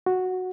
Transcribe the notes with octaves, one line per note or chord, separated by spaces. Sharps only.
F#4